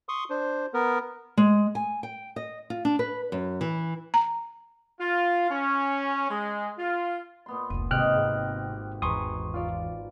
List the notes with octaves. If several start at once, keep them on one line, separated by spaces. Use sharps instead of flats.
C6 C#6 D#6
D4 C5
B3 A#4
G#3
G#5
G5
D#5
F4
D4
B4
F#2
E3
A#5
F4
C#4
G#3
F4
A#2 B3 C6
F1 C#2 D#7
G#1 C3 G#3 G4 D#5 G5 F6 F#6
G#2
G#1 E2 B4 G#5 A#5 C6 C#6 D#6
F4 D5 F5